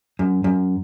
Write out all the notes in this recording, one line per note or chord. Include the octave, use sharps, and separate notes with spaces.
F#2
F#2